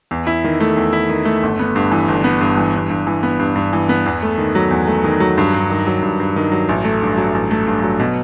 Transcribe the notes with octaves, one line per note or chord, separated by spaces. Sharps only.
E2
E4
D#3
A3
E2
E4
D#3
A3
G1
B3
G2
E3
G1
B3
G2
E3
G2
G2
E3
B3
G2
G2
E3
B3
E2
A3
D#3
F#3
E2
A3
D#3
F#3
G2
G2
D#3
F#3
G2
G2
D#3
F#3
A1
A3
G2
F#3
A1
A3
G2
F#3
B2